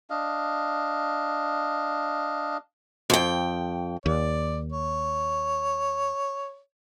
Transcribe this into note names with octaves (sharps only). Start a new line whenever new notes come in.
D4 D#5 F5
F2 G5
D#2 D5
C#5